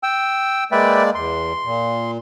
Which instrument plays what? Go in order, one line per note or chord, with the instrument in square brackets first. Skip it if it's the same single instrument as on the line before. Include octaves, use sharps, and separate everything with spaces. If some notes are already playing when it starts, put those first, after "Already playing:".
[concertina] G5 E6
[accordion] G#3 A#3 D5 [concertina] B4 E5 G5
[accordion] E2 [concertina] C6
[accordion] A#2